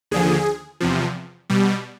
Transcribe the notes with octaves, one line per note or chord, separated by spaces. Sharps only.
D#2 D3 F3 G#4
E2 C3 F3
B2 G3